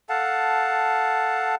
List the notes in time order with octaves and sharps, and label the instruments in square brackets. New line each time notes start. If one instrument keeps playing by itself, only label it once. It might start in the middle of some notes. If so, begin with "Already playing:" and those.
[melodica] A4 F5 F#5 A5